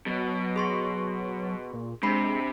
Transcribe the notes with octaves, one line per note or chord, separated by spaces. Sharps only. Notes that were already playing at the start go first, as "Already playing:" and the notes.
B2 F#3
G#4 C6 C#6
A#2
C3 G#3 D4 B5 C7